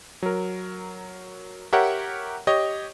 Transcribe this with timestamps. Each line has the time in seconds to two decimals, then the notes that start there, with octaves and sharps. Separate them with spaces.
0.23 F#3 A#4
1.73 G4 A#4 C#5 E5 F#5
2.47 G4 C#5 D#5